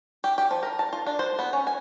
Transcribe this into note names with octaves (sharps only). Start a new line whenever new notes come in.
G4
G4
F3
A#4
A5
F4
D4
C5
B3
C#4
G#5